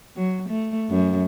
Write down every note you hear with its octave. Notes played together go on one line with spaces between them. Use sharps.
F#3
A3
F#2